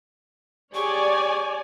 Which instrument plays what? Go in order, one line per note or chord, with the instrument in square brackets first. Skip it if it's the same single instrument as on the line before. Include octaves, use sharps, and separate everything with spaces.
[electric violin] G4 G#4 [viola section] C#5 D5 G#5 [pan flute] C#6